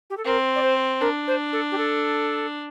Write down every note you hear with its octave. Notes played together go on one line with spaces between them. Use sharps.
G4
A4
C4 A#4
D5
C5
D4 A#4
C5
A4
G4
A4